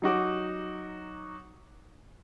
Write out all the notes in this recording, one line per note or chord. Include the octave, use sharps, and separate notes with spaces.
F#3 D#4 F#4 D6